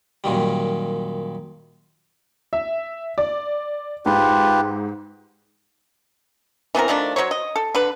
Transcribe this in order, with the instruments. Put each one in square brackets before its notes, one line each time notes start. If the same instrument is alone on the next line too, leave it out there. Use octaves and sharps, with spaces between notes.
[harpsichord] F#2 A#2 D#3 G3
[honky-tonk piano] E5
D5
[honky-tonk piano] G#2 [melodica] F4 G4 B4
[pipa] E3 B3 C4 A#4
D#3 F3 A3 D4
F#3 A#3 C5 C#5
D#5
A4
D3 B4